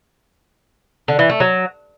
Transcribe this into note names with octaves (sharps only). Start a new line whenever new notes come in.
D3
E3
A3
F#3